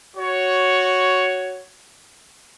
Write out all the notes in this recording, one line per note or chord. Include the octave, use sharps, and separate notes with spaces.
F#4 C#5